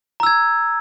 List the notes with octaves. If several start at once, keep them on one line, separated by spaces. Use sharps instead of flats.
A#5 E6 G#6